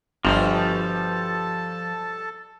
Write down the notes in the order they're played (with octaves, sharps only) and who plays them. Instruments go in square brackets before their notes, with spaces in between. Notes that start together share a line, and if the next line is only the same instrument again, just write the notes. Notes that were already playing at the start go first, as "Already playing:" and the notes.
[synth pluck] G1 [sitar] B2 G3 G4 [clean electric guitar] F3 [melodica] A4 A5